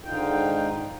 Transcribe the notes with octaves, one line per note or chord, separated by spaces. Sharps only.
G#2 D3 D#3 D#4 F4 G5